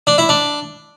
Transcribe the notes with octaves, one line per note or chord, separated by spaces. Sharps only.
D4
E4
D4